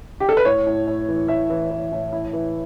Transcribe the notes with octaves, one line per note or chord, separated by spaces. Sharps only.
G4
A4
B4
A2 C#5
A2
A2
E3
A2 E5
E3
E3
A2
E4
E3